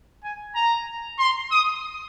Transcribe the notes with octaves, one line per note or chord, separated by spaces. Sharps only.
G#5
A#5
C6
D#6